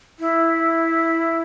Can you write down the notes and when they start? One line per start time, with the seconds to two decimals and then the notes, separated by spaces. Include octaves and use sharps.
0.19 E4